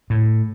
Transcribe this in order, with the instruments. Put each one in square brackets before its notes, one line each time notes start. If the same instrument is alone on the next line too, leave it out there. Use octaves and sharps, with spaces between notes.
[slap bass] A2